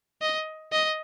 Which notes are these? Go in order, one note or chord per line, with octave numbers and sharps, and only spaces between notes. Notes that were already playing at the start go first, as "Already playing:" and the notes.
D#5
D#5